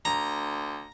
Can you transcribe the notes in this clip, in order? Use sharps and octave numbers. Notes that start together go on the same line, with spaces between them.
D2 A#5